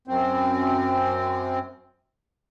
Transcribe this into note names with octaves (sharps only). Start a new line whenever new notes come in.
F#2 C4